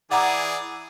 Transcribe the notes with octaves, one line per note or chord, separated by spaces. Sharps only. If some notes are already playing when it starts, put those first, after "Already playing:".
E3 G#4 D5 F#5 A#5 D6